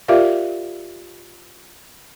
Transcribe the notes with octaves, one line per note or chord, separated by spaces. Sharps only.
F4 G4 A#4 D5 E5 F5